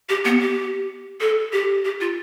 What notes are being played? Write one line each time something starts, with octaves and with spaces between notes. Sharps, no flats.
G4
B3
G4
A4
G4
G4
F4